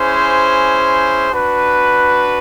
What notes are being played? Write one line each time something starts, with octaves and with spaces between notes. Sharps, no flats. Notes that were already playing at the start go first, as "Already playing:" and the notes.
Already playing: C#4 E4 G#4 C5
D4 F#4 B4